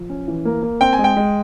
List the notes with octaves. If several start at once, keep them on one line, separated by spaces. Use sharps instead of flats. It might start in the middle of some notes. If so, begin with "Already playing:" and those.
Already playing: F3
C#4
E3
A#3
A#3
C4 G5
G#5
G#3
G5
G#3